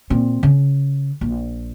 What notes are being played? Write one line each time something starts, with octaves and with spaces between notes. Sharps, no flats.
A#2 C4
C#3
A#1